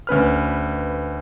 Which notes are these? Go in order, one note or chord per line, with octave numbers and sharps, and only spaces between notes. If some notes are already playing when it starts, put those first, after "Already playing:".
D2 C#4 B4 F6